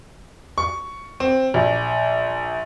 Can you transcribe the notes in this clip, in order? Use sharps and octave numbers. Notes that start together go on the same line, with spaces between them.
C#6
C4
A#1